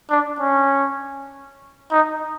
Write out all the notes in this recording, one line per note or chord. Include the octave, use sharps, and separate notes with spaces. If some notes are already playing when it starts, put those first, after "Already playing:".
D4
C#4
D#4